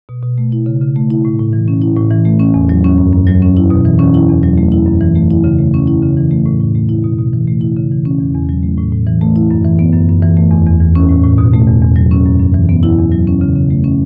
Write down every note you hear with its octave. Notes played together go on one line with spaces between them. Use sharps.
B2
B2
A3
E4
C#3
C#3
A3
E4
A2
A2
E3
C#4
E4
A2
E3
A3
C#4
E2
F#3
C#4
F#2
F#2
F#3
C#4
E4
B2
E3
C#4
E4
E2
F#3
A3
E4
F#2
E3
A3
E4
C#3
A3
C#4
E4
C#3
E3
A3
A2
A2
A3
E4
B2
B2
E3
A3
E4
C#3
E3
C#4
E2
E2
F#3
A3
A2
A2
E3
A3
E4
F#2
E3
B3
F#2
F#2
E3
A3
E2
E2
E3
C#4
A2
A2
B2
A3
E2
E2
F#3
C#4
F#2
F#2
E3
B3
E4
E2
F#3
C#4
C#3
C#3
A3
C#4